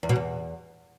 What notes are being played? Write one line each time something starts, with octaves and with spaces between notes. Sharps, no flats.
E2
B2
E2